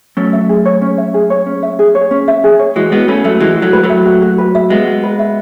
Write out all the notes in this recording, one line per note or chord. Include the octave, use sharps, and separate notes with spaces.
F#3 A3 C#4
E5
G#4
C#5
C#4
E5
G#4
C#5
C#4
E5
G#4
C#5
C#4
E5
G#4
C#5
E3 G#3 F#4
G#3 B3 F#4
A3 C#4 B4
F#3 A3 E5
E3 G#3 F#4
F#4
F#3 A3
B4
F#3 A3
E5
F#4
F#4
B4
E5
G#3 B3 F#4
F#4
B4
E5